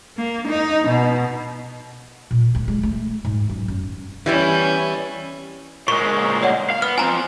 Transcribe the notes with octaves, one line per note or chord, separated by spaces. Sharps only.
A#3
D#4
B2
A#2
D2
G#3
A3
G#2
F#2
F#2
E3 G3 B3 C#4 E4
A#2 G#3 C#6
C#5 D5 F#5
F5
B3 F6
C4 F4 G#5 A#5